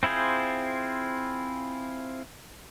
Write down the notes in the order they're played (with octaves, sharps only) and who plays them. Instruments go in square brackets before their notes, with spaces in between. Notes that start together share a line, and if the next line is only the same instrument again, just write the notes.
[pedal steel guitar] C4 E4 F4 G#4 C5